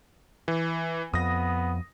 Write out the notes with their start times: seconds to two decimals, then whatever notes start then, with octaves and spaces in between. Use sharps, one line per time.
0.48 E3
1.14 F2 B3 D#6 A#6